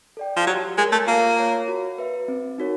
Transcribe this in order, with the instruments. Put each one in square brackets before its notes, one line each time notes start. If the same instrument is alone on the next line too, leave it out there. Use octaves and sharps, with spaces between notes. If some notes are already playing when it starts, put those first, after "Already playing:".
[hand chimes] A4 D5 G5
[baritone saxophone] F3
[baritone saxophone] F#3 [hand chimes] G4
[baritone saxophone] G#3 [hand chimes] A#4 C#5
[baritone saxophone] A3
[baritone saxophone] A#3 [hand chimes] F4
[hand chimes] A#4 C#5
F#4
B4 E5
C4
D#4 F#4 A#4 C#5